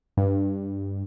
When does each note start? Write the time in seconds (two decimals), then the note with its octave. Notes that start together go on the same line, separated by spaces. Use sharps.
0.17 G2